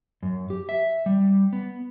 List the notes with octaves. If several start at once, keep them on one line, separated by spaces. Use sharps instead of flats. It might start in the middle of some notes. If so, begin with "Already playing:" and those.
F#2
G4
E5
G3
B3